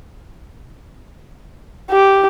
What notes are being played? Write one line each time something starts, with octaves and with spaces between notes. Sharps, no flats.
G4